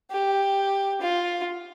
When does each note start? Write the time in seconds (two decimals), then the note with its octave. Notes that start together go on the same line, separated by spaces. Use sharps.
0.11 G4
1.01 F4